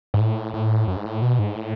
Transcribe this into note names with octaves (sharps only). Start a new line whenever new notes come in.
G#2
A2
A2
F#2
G#2
A2
B2
G#2
A2